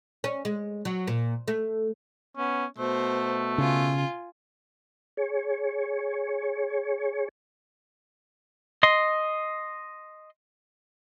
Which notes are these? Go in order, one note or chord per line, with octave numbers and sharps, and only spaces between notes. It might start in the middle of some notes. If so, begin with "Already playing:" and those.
C#4
G#3
F#3
A#2
A3
B3 C#4
B2 A3 C5
C#3 F4 G#5
G#4 C#5
D#5 C6